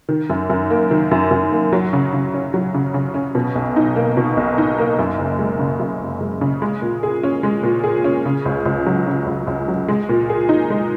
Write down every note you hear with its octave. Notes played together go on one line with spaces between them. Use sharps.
D#3
F#2
F#2
A#3
D#3
F#2
F#2
A#3
F#3
C#3
C#3
C#4
F#3
C#3
C#3
C#4
B2
B1
D#4
A#3
B2
B1
D#4
A#3
F#2
F#1
G#3
C#3
F#2
F#1
G#3
C#3
G#3
A#2
G#4
C#4
G#3
A#2
G#4
C#4
C#3
C#2
C#2
F#3
C#3
C#2
C#2
F#3
G#3
A#2
G#4
D#4
G#3